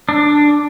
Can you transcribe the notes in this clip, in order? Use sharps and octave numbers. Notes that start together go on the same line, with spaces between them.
D4